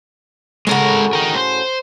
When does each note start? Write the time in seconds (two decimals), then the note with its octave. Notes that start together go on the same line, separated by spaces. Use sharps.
0.67 A2 C#3 G#3 F#4 A#4
1.13 A#4 G5
1.34 C5